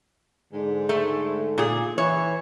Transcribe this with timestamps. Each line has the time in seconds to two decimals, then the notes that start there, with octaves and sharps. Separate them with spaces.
0.53 G#2 D3
0.89 A3
1.58 A#2 G#4
1.98 E3 C#5